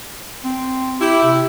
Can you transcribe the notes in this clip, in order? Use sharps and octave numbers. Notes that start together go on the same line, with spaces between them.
C4
E4 G4
C3